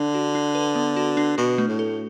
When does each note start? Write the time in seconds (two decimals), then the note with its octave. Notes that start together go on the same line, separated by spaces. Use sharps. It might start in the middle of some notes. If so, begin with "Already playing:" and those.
Already playing: D3 D4
0.14 F#4
0.35 D4
0.55 B4
0.76 B3
0.96 F#4
1.17 D4
1.38 B2 F#4
1.58 A3
1.68 A2
1.79 A4